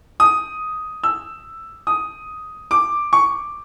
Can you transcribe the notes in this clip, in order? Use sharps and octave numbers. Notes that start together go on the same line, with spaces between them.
D#6
E6
D#6
D6
C#6